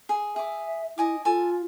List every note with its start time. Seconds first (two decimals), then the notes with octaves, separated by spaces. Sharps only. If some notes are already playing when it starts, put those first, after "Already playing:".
0.09 G#4
0.36 G#4 E5 D6
0.98 E4 D#5 G#5 D6
1.25 F4 A4 G#5